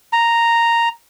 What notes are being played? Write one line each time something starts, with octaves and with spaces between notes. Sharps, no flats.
A#5